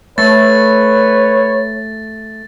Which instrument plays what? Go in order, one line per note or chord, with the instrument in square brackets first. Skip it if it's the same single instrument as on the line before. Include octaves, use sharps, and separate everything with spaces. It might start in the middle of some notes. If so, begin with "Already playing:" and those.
[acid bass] A3 [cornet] B4 [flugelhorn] C#5 [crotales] A6